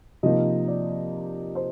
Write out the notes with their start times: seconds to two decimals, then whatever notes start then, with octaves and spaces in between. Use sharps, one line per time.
0.23 C3 F3 A#3 D#4 D#5
0.68 D5
1.55 C5